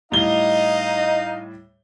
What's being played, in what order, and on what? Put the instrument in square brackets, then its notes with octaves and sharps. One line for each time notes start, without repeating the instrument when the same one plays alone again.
[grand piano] A2 G3 G7 [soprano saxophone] D#4 [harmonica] D#5 F5